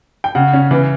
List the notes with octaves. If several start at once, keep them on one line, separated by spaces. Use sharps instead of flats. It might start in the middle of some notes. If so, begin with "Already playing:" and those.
G5
C#3 F#5
C#4
E3